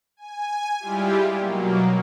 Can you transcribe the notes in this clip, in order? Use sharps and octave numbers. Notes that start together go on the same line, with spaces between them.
G#5
G3 G#3 E4 F4 G4
B2 F#3 A#3